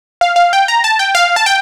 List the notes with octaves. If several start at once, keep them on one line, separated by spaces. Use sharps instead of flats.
F5
F5
G5
A#5
A5
G5
F5
A5
G5